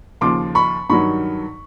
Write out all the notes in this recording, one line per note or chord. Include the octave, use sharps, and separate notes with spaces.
D#2 C#3 F3 C6 D6
B5 C#6
G2 D#3 F#3 B5 C#6